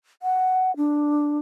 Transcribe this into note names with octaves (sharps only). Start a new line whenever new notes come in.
F#5
D4